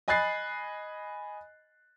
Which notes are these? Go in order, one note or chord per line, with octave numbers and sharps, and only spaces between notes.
D#5 G#5 B5 F#6 A6 C7